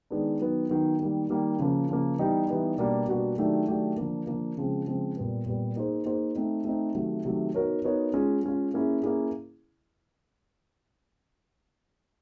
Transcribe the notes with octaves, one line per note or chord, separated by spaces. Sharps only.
D#3 G#3 B3 D4
D#3 F#3 B3
D#3 F#3 B3
D#3 G3 A#3
D#3 G3 A#3
C#3 F3 A#3
C#3 F3 A#3
E3 G3 B3 D#4 G4
E3 G3 B3 D#4 G4
B2 G3 A#3 D4 F#4
B2 G3 A#3 D4 F#4
D#3 F#3 A3 D4 G4
D#3 F#3 A3 D4 G4
D3 F3 A#3
D3 F3 A#3
C#3 F3 G#3 C4
C#3 F3 G#3 C4
A#2 G3 B3
A#2 G3 B3
A#3 D#4 G#4 C5
A#3 D#4 G#4 C5
A3 C4 D#4
A3 C4 D#4
C3 D#3 F#3 A3
C3 D#3 F#3 A3
B3 D#4 F#4 A#4 C#5
B3 D#4 F#4 A#4 C#5
G#3 C#4 F4
G#3 C#4 F4
A#3 C#4 E4 G#4
A#3 C#4 E4 G#4